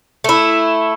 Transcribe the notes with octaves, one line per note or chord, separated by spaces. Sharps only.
A3 E4